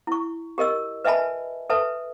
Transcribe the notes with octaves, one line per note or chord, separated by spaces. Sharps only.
E4 C#6
G4 A#4 D#5 E6
B4 D#5 E5 G#5 A5 B5
A4 B4 E5 A5